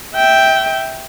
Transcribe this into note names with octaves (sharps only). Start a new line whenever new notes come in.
E5 G5